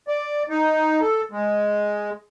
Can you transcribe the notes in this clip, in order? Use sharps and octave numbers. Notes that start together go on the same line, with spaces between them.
D5
D#4
A4
G#3